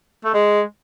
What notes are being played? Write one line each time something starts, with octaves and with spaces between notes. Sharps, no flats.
A3
G#3